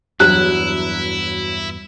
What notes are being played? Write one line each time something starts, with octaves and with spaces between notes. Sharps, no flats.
E2 G2 F#3 E4 F#6